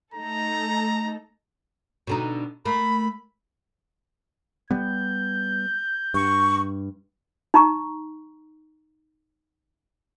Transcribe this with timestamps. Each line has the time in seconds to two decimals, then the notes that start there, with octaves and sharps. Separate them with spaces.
0.14 A3 D#4 A4 A#5
2.07 B2 D3 D#4
2.65 A3 A#3 B5
4.71 G3 B3 G6
6.14 G2 C#6
7.54 D#4 A#5 C#6